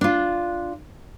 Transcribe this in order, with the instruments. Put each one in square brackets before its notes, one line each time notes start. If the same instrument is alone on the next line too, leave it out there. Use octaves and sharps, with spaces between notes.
[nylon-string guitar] D4 F4